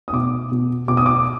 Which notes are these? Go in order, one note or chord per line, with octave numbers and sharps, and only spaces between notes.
D#6
B2 D6
B2
B2 D6
D#6
D6